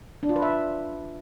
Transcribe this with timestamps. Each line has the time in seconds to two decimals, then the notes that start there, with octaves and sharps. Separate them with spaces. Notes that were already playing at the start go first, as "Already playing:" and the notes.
0.23 D4
0.29 F4
0.36 B4
0.42 E5